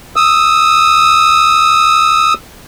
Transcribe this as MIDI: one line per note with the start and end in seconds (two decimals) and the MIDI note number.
0.16 2.33 87
0.16 2.33 88